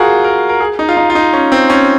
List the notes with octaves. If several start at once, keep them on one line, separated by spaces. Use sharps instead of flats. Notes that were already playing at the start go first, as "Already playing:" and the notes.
Already playing: F4 F#4 G#4 A#4
A#4
A#4
G#4
D#4
F4
D#4
F4
D#4
C#4
C4
C#4